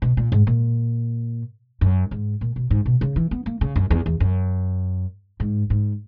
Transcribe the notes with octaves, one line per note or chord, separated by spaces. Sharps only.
B2
A#2
G#2
A#2
F#2
G#2
A#2
B2
G#2
B2
C#3
E3
B3
A#3
C#3
F#2
E2
E2
F#2
G#2
G#2